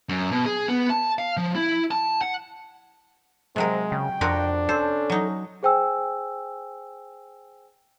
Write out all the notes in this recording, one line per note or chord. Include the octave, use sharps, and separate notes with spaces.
F#2
B2
G#4
B3
A5
F5
F3
E4
A5
F#5
C3 F#3 G#3 C4 A#4
C#3 G5
F2 C4 D4 F#4 A#4
C#4 A4 C5
F#3 D#4
G#4 C5 G5 G#5 E6